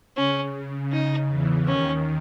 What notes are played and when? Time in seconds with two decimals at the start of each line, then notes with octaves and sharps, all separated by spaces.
0.17 C#3 C#4
0.92 D#4
1.29 E2 E3
1.67 D#2 D#3 C#4